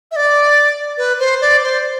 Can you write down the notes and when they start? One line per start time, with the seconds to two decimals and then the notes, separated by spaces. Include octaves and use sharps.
0.11 E5
0.16 D5
0.98 B4
1.19 C5
1.41 D5
1.63 C5